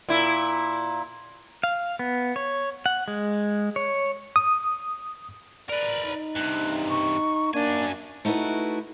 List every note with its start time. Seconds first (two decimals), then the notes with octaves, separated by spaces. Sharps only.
0.08 A#2 E4
1.63 F5
1.99 B3
2.36 C#5
2.86 F#5
3.08 G#3
3.76 C#5
4.36 D#6
5.69 A#4 B4 D5
6.05 D#4
6.36 G2 C3 F#6
6.90 C#6
7.54 F#2 A#3 D4 G#5
8.25 A3 D#4 E4 F#4 B4